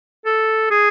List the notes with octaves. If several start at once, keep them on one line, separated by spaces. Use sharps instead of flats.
A4
G#4